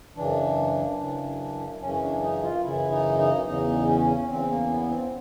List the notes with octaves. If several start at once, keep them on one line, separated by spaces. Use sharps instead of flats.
F#2 C#3 E3 D4
F#2 C#3 E3
F#2 C#3 E3 C#4
D4
D#4
F4
F#2 C#3 E3 E4
D#4
D#4
E2 C#3 E3 D#4
C#4
E2 C#3 E3 C4
A#3
B3
C4